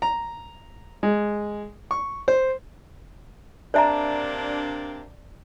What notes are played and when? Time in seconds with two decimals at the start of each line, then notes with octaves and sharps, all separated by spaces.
0.02 A#5
1.03 G#3
1.91 C#6
2.28 C5
3.74 C3 A#3 D4 C5 D5 E5 A5 A#5